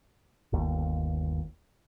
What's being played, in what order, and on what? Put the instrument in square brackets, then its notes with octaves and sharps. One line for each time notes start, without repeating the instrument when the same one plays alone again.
[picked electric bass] G1 D#2